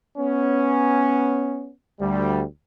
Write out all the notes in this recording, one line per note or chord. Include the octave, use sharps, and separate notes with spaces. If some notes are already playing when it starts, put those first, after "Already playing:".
B3 C#4
D2 G3